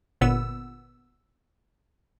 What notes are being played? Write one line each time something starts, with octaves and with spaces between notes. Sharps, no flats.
G1 A#2 B3 E6